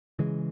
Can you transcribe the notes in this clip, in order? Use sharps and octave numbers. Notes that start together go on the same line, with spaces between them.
C#3 E3 G#3